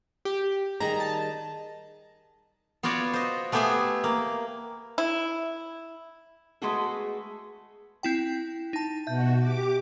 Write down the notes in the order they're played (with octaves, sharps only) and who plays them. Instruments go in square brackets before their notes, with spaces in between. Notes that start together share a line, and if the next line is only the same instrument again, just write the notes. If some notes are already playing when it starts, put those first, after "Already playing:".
[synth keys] G4
[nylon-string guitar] D#3 G3 G#4 [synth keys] A#5
[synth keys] A5
[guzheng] B3 F4 F#4 C#5 D5
C5 D#5
A3 B3 G4 G#4 E5 G#5
A#3
[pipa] E4
[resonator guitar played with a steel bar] G#3 A3 B3 F#4 G#4 A4
[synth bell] C4 E4 G5
D#4 A5
[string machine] B2 F#4 [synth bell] E5 G6
[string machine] G4 D6